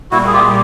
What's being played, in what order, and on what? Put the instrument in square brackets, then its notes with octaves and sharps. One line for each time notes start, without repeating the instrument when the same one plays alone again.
[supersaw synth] A#2 G3 A#3 [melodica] E4 F#4
[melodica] G#4
F4 G4